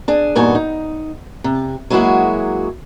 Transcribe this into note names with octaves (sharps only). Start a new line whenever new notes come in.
D4 G#4
E2 G2 A#2 D#4 F#4 G#5
D#4
C3
F#3 G#3 A#3 E4 F#4 G#4